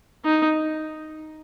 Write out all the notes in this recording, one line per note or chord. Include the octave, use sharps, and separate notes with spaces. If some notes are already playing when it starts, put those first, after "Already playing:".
D#4